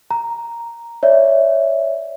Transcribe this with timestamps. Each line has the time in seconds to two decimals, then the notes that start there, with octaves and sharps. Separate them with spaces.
0.11 A#5
1.03 C#5 D5 E5